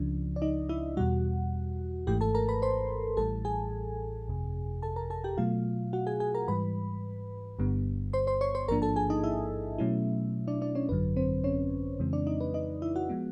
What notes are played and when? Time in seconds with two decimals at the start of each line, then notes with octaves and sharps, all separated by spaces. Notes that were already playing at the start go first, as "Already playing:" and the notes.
Already playing: C#2 C#3 F3 D4
0.36 D5
0.42 D#4 D#5
0.69 E4 E5
0.97 E2 B2 G3 F#4 F#5
2.07 G#1 G#2 E3 A3 G4 G5
2.21 A4 A5
2.34 A#4 A#5
2.49 B4 B5
2.62 C5 C6
3.17 A1 A2 E3 G3 A4 A5
3.45 G#4 G#5
4.28 G1 F2 C3
4.82 A4 A5
4.96 A#4 A#5
5.10 A4 A5
5.24 G4 G5
5.37 B2 F#3 A3 F4 F5
5.93 F#4 F#5
6.07 G#4 G#5
6.20 G#4 G#5
6.35 A#4 A#5
6.48 G#2 E3 G3 B4 B5
7.58 G1 G2 D3 G3 B3
8.13 C5 C6
8.27 C5 C6
8.41 C#5 C#6
8.55 C5 C6
8.68 A1 G#2 F3 A#3 D4 A#4 A#5
8.82 A4 A5
8.96 G#4 G#5
9.10 D#4 D#5
9.24 E4 E5
9.78 B2 F#3 A3 C#4 E4
10.48 D4 D5
10.61 D4 D5
10.75 C#4 C#5
10.89 G#1 F#2 D3 F#3 B4
11.16 C4 C5
11.44 C#4 C#5
11.99 F2 C#3 E3 G#3 C4
12.13 D4 D5
12.27 D#4 D#5
12.40 B4
12.54 D#4 D#5
12.82 E4 E5
12.95 F#4 F#5
13.09 F3 G#3 B3